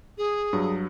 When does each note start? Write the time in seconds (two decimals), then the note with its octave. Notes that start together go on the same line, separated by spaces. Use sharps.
0.18 G#4
0.53 G2 F#3